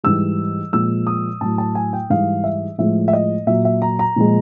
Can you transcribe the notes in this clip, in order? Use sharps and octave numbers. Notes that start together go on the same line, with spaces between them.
G#2 E3 G3 E6
A#2 F3 G#3 E6
D#6
A2 F#3 A5
A5
G#5
G5
G#2 E3 G3 F5
E5
A2 F3 G#3 E5
E5
D#5
A#2 F#3 E5
E5
A#5
A#5
A#2 F3 G#3